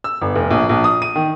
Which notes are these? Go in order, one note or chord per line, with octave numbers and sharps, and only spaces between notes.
E6
G1
F1
A#1
A#1
D#6
D#7
D#3